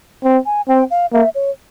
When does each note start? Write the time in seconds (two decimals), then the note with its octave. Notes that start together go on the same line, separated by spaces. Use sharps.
0.24 C4
0.46 G#5
0.68 C4 G5
0.91 F5
1.13 A#3 E5
1.35 C#5